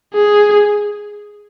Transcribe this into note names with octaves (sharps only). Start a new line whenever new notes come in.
G#4